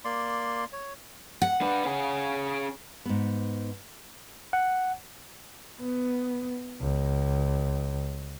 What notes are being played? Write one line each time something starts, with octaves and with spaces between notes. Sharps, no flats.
A#3 D5 C6
C#5
F#5
D4 B4
C#4 G#4
G#2 B3
F#5
B3
C#2